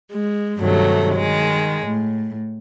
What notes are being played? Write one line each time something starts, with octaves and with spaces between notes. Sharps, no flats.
G#3
G2 C3 D#3 F#3 A3
D#3 G#3
A2